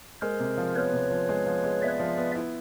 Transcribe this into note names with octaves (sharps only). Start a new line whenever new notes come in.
G#3 A#4 C5
C3
F3
B3 B4 C#5
C3
F3
G#3
F3
G#3
B3 D5 E5
F3
B3
E4